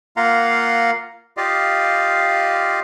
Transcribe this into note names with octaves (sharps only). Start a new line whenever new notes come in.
A#3 F4 F5 F#5 A#5 C6
F4 G4 D5 D#5 F5